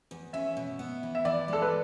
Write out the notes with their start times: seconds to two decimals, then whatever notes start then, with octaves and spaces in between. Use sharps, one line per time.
0.11 E2
0.33 C#4 E5
0.57 B2
0.79 B3
1.03 E3
1.15 E5
1.25 E3 D5
1.48 G#3 A4
1.62 B4